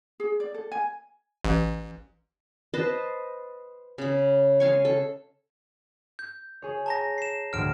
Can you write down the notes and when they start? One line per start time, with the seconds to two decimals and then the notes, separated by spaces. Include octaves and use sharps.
0.20 G#4
0.40 D5
0.54 A4
0.72 G#5
1.45 A1
2.74 B4 C5 D#5 A5
3.98 C#3 B5
4.60 G#3 F5 G#5 C#6
4.85 A4
6.19 G6
6.62 G#4 C#5
6.86 A5 A#5 A#6
7.18 C7 E7
7.53 D2 A2 D3 F6 D7 E7